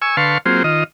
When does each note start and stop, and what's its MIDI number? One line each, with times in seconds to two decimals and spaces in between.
0.02 0.17 80
0.02 0.17 85
0.02 0.17 88
0.17 0.38 50
0.17 0.38 71
0.17 0.38 77
0.17 0.38 81
0.17 0.38 84
0.17 0.38 85
0.46 0.63 54
0.46 0.63 58
0.46 0.63 60
0.46 0.63 65
0.46 0.63 68
0.46 0.63 72
0.64 0.84 51
0.64 0.84 65
0.64 0.84 75